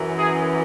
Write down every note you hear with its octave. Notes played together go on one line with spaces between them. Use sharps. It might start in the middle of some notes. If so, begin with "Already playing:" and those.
Already playing: F#2 E3
G#4